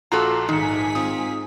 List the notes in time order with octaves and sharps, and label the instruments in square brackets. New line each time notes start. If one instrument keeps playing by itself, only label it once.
[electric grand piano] A#1 A#2 [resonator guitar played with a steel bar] F4 F#4 A4 [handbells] A#5 D6
[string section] G#2 G#4 B6 [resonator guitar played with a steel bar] D#3 [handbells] D#4 C#7
[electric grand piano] C4 F4 D#6